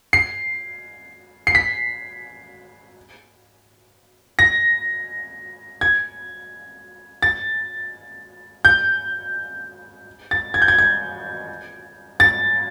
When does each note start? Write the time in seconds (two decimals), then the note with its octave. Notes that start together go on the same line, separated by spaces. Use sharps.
0.13 C7
1.47 C7
1.55 B6
4.39 A#6
5.81 G#6
7.22 A6
8.65 G6
10.31 A6
10.54 G#6
10.62 G6
10.68 G#6
10.79 G#6
12.20 A6